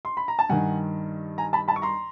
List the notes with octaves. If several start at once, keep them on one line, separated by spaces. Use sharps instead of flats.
C6
B5
A#5
A5
G2 D#3 F#5 G#5
G#5 A#5
A5 B5
A5 B5
C#6
A#5 C6